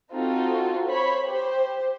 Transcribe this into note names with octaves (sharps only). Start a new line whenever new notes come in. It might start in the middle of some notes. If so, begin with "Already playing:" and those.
C4 D#4 F4 F#4 A4
C5 C#5 B5
G4 C5